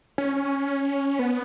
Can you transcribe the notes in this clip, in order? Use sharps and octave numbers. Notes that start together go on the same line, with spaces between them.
C#4
B3